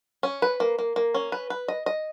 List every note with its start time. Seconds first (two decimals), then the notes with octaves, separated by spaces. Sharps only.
0.23 C#4
0.42 B4
0.60 A#3
0.79 A#3
0.96 A#3
1.14 C#4
1.32 B4
1.50 B4
1.68 D#5
1.86 D#5